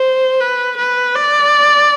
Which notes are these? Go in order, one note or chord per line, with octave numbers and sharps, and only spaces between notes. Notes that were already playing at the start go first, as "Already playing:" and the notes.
Already playing: C5
B4
B4
D5